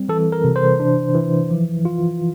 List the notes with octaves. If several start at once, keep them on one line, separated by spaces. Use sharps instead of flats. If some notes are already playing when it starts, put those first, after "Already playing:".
Already playing: G3 C4
E3 A4
A#4
C3
C5
D4
E3
F3
F4